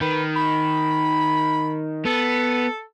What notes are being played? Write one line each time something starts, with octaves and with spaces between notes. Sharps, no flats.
D#3 B4
B5
B3 A4